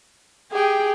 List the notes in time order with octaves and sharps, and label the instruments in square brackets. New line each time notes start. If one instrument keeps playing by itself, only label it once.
[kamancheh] G4 G5 [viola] G#4